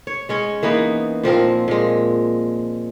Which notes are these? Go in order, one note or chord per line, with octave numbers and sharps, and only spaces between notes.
C#5
G#3 C#4 C#5
E3 A#3 B3 D#4
A#2 F3 C4 A#4
A#2 G#3